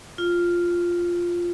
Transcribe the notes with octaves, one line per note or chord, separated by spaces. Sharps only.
F4